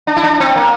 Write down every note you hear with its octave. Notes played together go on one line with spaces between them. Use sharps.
D4
E4
D4
C4
A#3